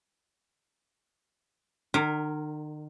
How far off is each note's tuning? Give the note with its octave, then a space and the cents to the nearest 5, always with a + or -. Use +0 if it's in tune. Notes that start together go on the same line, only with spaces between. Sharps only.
D#3 -45 A#4 -5